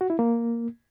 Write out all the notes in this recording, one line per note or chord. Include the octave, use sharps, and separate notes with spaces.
F#4
E4
A#3